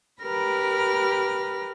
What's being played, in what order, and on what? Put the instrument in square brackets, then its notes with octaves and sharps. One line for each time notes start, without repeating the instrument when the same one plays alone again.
[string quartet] G4 A#4 B4 B5 F6